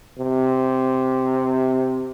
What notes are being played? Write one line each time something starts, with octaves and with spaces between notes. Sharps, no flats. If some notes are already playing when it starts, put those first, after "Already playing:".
C3